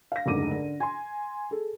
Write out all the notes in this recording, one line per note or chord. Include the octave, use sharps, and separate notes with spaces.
F5 A#6
F#1 D2 G#2 D6 D#7
D3
G#5 C6
G#4 A4